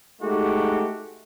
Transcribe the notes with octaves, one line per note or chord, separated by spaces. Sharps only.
G#3 A3 D#4 F#4 G4